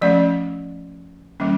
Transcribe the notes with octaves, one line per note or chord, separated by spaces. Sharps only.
F3 A3 C#4 D5
E3 G3 A#3 C#4